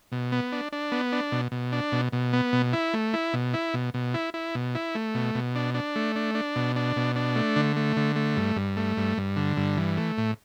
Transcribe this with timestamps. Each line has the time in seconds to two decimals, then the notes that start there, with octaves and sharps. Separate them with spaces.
0.12 B2
0.32 B3
0.52 D4
0.72 D4
0.92 B3
1.12 D4
1.32 B2
1.52 B2
1.72 D4
1.92 B2
2.13 B2
2.33 B3
2.53 B2
2.73 E4
2.94 A3
3.13 E4
3.33 B2
3.54 E4
3.74 B2
3.94 B2
4.14 E4
4.34 E4
4.55 B2
4.75 E4
4.95 A3
5.15 B2
5.35 B2
5.55 D4
5.74 D4
5.96 A3
6.16 D4
6.35 D4
6.56 B2
6.76 D4
6.96 B2
7.16 D4
7.36 A3
7.56 D3
7.76 A3
7.97 D3
8.16 A3
8.37 G2
8.56 G2
8.77 A3
8.97 G2
9.17 G2
9.37 D3
9.57 G2
9.77 E3
9.97 A3
10.18 A2